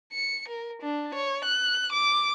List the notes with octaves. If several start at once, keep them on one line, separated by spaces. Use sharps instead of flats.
C#7
A#4
D4
C#5
F#6
D6